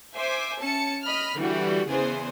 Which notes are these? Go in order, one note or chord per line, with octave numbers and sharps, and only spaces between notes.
C5 E5 G#5 D6
C#4 A5 C#7
D#5 B5 F6
D3 E3 G3 F#4
E2 C#3 B3 G#4 C5